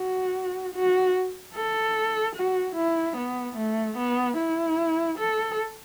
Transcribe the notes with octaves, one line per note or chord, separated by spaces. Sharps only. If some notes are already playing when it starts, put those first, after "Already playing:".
Already playing: F#4
F#4
A4
F#4
E4
B3
A3
B3
E4
A4